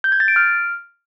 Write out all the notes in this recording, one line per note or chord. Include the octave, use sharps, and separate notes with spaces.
G6
G#6
A6
D7
F6